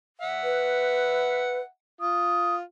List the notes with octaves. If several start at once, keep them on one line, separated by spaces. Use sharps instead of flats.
E5 F#5
B4
F4 D#6